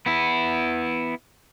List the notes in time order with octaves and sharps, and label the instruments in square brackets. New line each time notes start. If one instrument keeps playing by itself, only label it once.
[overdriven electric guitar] B3 E4